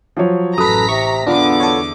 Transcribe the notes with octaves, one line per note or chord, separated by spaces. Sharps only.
F3 F#3 C#5
A1 F#2 A4 B4 A#5 D#6 B6
C3 C#6
E2 D3 B3 D4 F4 D6
A4 C#5